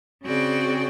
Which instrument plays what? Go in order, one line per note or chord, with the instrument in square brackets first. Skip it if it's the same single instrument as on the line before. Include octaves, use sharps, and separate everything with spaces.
[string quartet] C#3 C4 F#4 G#4 D5 G5